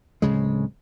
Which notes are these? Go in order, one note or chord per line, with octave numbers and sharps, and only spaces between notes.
D1 A#1 C#3 G#3